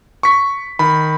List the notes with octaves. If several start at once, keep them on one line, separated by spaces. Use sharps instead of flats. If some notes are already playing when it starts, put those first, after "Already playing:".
C#6 B6
D#3 B5